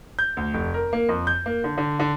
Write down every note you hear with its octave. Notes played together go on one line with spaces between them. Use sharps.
G6
D2
F1
A#4
A#3
F2
G6
A#3
D3
D3
D3